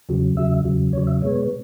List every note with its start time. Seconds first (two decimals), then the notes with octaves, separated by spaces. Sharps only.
0.09 E2 C#3 F#3
0.37 E2 C#3 F#3 E5
0.65 E2 C#3 F#3
0.93 E2 C#3 F#3 C#5
1.07 E5
1.22 B2 G#3 B3 C#5